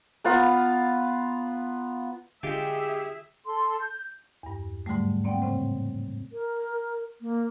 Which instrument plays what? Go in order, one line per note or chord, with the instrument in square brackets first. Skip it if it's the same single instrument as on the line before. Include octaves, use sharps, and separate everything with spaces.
[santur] B3 F4 B4 A#5
[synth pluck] D3 [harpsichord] G#3 F4 G5 [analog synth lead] G4 [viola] G#4 E5
[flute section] A4 C6
G6
[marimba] E2 G2
G#2 D3 F#3 G3 A3
A#3 C4 D5 F#5 G5
A2 C#3 C4 C5
[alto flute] A#4
A#3